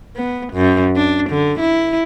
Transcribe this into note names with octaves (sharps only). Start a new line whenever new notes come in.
B3
F#2
D4
D3
E4